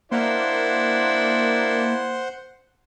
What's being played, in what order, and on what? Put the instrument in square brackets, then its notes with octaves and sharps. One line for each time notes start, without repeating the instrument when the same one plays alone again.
[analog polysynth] A#3 [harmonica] D4 E4 [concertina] C5 F#5 C6